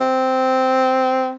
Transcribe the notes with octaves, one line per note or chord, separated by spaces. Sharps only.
C4